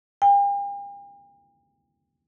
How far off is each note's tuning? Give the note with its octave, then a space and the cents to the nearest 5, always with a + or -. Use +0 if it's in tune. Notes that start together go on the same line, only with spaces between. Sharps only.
G5 +45